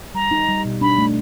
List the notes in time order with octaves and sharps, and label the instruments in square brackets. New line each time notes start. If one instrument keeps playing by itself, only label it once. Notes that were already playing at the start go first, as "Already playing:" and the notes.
[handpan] G3 [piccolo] A#5
[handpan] D#4
G3
B2
[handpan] D4 [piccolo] B5
[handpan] A3